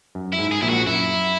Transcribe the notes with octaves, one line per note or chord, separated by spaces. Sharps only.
F#2
E4
G#2
G#4
A#1 A#2 E4
F#4
F#2 E4